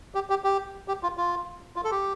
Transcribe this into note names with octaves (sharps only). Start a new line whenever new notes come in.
G4
G4
G4
G4
F4
F4
F4
A4
G4